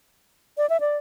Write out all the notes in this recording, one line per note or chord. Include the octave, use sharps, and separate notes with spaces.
D5
E5
D5